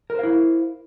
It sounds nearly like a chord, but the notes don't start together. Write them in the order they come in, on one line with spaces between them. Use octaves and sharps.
A#4 C5 F5 E4